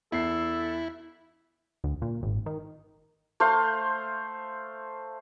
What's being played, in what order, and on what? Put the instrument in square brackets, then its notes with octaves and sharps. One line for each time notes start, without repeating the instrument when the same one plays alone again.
[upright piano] E2 C7 [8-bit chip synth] E4 [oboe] A4
[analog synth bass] D2
A#2
G#1
D#3
[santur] A3 C5 F5 C6